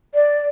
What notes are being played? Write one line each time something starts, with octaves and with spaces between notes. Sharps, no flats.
D5